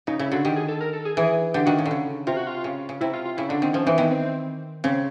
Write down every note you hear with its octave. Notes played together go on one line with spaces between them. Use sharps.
C#3 D#4
C#3 E4
D3 F#4
D#3 G4
G#4
A4
A#4
A4
G#4
E3 G#4
D3 G4
D#3 F#4
C#3
D3
C#3
C3 F4
F#4
F4
C#3
C#3
C3 E4
F4
F4
C#3 E4
D3 D4
D#3 C4
F3 C#4
E3 C4
D#3 B3
C4
C#3 C4